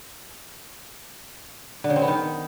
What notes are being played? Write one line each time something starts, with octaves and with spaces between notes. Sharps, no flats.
D3
C#3
C4
B3
D#3